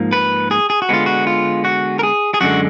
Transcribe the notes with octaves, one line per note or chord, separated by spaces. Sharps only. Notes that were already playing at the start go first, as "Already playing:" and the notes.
Already playing: G#2 F3 A#3
B4
G#4
G#4
F#4
D3 G#3 B3 F4
F#4
F4
F#4
A#4
G#4
G#4
F#2 D3 G#3 F#4